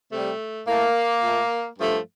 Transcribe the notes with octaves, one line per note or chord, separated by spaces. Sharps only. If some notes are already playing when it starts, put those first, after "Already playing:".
C3 G3 A3
A2 A3 A#3
A#2 A3
G2 F3 A3